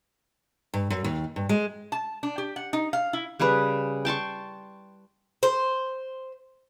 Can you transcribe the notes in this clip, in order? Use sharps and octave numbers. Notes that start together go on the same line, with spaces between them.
G2
F#2
D#2
G2
G#3
A5
D4
G4
F#5
D#4
F5
E4
C#3 G3 G#4 B4
G5 A5 C6 C#6
C5